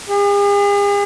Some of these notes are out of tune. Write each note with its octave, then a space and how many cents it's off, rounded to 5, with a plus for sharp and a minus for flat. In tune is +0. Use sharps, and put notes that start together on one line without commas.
G#4 -45